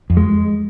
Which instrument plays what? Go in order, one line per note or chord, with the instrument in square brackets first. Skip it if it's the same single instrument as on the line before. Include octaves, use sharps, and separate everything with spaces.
[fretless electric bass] F2
[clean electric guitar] G#3